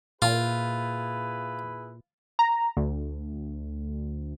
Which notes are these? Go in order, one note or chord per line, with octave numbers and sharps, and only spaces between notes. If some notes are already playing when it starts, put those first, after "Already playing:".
A#2 E4 F4 G#4 B4
A#5
D2